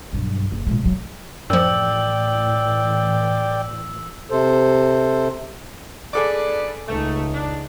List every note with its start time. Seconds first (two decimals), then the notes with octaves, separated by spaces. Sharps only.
0.13 B1 G2
0.52 F#1
0.67 A#2 G#3
0.82 F#2 F#3
1.50 F#2 A2 E3 F3 D5 G5 E6
4.31 C3 A4 C5
6.13 D2 G#4 A4 B4 D5 D6
6.88 C#2 A3 D#4
7.34 D4